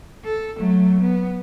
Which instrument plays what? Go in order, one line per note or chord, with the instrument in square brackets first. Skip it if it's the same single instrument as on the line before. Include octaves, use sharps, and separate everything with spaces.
[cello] A4
F#3 A3
B3